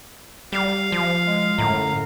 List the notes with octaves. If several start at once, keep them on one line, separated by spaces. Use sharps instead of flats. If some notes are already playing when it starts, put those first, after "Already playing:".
G3 F5
F3
G#3
F#2 A2 D3 A#5